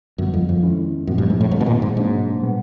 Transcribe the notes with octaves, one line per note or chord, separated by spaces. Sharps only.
F#2 D3 G3 B3
F2
F2
D#3 G#3 C#4 E4
F#2 A#2 F3 A3 C4
G2
G#2
A2
G#2 D#3 G#3 C4 D#4
B2
A#2
G#2
G#2 B2 F#3 A#3 D4
A#2 G3 B3